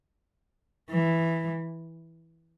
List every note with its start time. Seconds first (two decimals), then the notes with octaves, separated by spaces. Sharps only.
0.90 E3